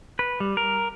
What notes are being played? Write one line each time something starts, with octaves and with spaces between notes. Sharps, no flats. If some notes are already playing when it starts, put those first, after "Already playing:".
B4
G3
A#4